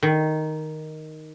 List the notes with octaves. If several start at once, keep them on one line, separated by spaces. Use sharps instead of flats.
D#3